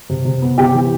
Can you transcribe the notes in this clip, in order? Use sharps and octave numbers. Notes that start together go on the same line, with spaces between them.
C3
C3
B3
C3 G4 G5
E3